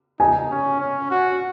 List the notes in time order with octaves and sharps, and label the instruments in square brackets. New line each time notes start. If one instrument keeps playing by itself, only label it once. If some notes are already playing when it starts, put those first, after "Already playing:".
[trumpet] D#4 [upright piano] G#5
[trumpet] C#4
C#4
F#4